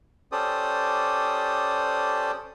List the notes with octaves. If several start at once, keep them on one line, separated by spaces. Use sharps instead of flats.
C#4 G4 A4 C5 D5 D#6